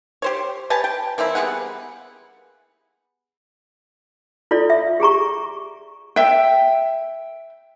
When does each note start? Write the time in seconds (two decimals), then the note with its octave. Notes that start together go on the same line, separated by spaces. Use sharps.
0.22 G4 C5 C#5
0.70 G4 B4 G#5 A5
0.84 G5
1.18 E3 A#3 C4 E4
1.35 G3 B3 G#4 F#5
4.51 E4 F4 A4 D5
4.70 E5
5.00 G4 G#4 A#5 C#6
6.16 E5 G5